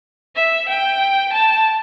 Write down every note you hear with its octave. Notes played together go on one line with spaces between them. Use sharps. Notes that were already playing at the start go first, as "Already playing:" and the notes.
E5
G5
A5